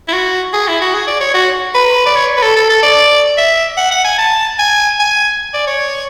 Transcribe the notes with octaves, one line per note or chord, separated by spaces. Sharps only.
E4
F#4
G#4
E4
F#4
G#4
D5
C#5
F#4
B4
D5
C#5
B4
A4
A4
A4
D5
E5
F#5
F#5
G#5
A5
G#5
G#5
D5
C#5